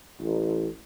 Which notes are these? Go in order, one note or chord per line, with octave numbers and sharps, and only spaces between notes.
A1